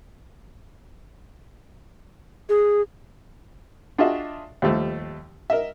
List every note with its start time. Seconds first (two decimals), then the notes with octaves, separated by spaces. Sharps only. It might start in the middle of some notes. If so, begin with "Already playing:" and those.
2.49 G#4
3.98 D4 F4 F#4 G#4 D#5 E5
4.62 D#2 F3 G3 A3
5.50 A#4 D#5 E5